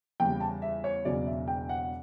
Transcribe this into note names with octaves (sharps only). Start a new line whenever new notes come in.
E2 C#3 G3 G5
A5
E5
C#5
E1 E2 C#3 F#3 D5
E5
G5
F#5